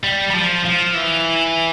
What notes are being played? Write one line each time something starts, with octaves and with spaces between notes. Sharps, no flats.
G3
G3
F3
F3
E3